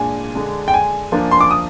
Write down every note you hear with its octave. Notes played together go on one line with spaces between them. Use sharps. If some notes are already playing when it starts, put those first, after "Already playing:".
Already playing: A#2 G#3 D4 G#5
D3 G#3 D4
G5
G#5
F3 A#3 D4
C6
D6
D#6